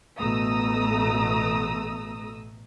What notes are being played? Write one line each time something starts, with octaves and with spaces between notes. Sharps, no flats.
A1 B2 A3 A#5 D#6 E6